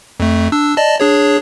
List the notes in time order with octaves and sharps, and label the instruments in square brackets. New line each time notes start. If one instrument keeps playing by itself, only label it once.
[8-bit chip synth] F2 A3
D4 E6
D5 D#5 A5
D4 G#4 C#5